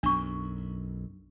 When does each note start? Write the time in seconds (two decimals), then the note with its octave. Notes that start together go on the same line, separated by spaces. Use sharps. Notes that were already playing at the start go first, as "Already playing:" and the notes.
0.03 B1 F#2 D4 C#6